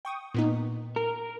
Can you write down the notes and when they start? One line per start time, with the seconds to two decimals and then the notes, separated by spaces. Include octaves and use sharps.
0.05 G5 C#6 D#6
0.34 A#2 B3 D#4
0.96 A#4